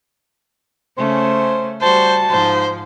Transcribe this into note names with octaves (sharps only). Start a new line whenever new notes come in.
C#3 A3 C#4 C5
G3 F#4 C5 A5
G#2 F3 C5